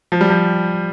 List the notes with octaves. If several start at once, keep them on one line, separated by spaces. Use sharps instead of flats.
F3
G3
F3